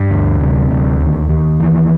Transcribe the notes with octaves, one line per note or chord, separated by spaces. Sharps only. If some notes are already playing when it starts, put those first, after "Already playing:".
Already playing: G2
D2
C3
D2
D#2
D#2
E3